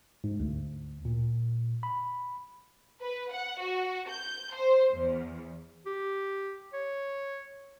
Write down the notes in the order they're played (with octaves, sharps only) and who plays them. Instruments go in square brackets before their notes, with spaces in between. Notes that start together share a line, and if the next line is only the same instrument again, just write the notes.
[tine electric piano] G#2
D2
A#2
B5
[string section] B4
F#5
F#4
G6
C5
E2
[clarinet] G4
C#5